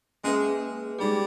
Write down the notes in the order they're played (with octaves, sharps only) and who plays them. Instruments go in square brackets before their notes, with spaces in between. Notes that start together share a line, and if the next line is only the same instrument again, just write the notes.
[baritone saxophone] G#3 [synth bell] A#3 C#4 G#4 B4
[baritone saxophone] G3 [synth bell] G#3 D#4 G#4